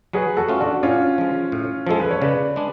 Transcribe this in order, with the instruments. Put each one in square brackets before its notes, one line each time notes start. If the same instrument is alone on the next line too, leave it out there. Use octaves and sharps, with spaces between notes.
[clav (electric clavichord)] F#3 [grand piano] G#4 B4
[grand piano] F#4 A4
[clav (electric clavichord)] A3 C#4 F4
[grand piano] D4 F#4
[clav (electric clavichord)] A2 [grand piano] C#4 F4
[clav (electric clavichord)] F3 G#3
A2
[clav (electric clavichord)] F3 G#3 [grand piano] A4
[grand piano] B4
C#5
[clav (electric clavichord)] C#3 [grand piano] B4 D5
[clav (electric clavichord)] G#3 D4